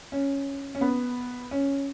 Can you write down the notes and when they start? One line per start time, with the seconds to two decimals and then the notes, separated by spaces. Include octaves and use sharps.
0.12 C#4
0.75 C#4
0.81 B3
1.51 C#4